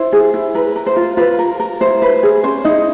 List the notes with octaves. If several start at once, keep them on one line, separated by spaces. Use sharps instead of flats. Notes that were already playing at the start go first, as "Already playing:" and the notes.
Already playing: E4 C5
G#4
E4
A#4 B4
A#4
C5
F4
F4 B4
A#4
A#4
E4 C5
B4
G#4
C#4 C5
D#4 E4 D#5